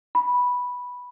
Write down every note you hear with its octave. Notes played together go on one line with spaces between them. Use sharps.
B5